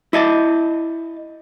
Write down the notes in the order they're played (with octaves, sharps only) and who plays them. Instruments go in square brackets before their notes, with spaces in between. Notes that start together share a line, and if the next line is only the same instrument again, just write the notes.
[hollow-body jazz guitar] E4 D#5 A5